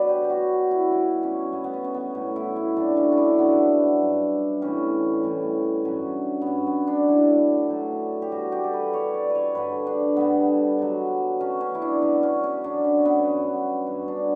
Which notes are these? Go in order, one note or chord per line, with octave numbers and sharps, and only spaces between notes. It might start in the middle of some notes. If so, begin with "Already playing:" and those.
Already playing: B2 F#3 B4 D5
G4
G4
B2 F#3 F#4
E4
B2 G3 E4
C#4
B2 G3 B3
B3
C#4
C#4
B3
A2 F#3 C#4
E4
E4
A2 F#3 D4
C#4
D4
E4
G2 F#3 B3
G2 F#3
A2 E3 G3 C#4
A2 E3 G3
G2 F#3 C#4
B3
G2 F#3 C#4
B3
D4
A2 F#3 E4
A2 F#3
G4
B2 G3 F#4
G4
A4
B4
B2 G3 C#5
D5
B4
C#5
G2 D3 G3 B4
D4
G2 D3 G3 B3
B2 F#3
B2 F#3 C#4
C#4
E4
D4
B2 F#3 C#4
C#4
C#4
B2 F#3 D4
C#4
B3
G2 F#3
G2 F#3 C#4
D4